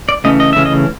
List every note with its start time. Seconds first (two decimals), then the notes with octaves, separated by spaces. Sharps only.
0.09 D5
0.24 C#3 E3 A3 C#4 D#5
0.40 D#5
0.53 C#3 E3 A3 C#4 E5
0.65 D#5